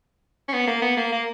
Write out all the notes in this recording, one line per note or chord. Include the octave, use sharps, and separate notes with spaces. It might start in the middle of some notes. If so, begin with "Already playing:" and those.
C#4
B3
A#3
B3
A#3
A#3